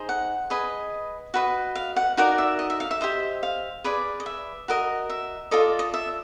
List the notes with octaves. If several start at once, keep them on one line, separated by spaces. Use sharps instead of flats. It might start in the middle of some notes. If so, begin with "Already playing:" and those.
Already playing: D#4 G#4 C5
F#5
G#4 B4 D#5
F#4 B4 D#5
F5
F#5
D#4 F#4 A#4 D5 F5
E5
D#5
E5
F5
E5
G4 C5 D#5
F5
G#4 B4 D5
D#5
E5
F#4 A#4 D#5
E5
F4 A4 D5 D#5
D#5
E5